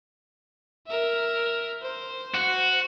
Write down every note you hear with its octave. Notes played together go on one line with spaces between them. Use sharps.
A#4 E5
C5
F#4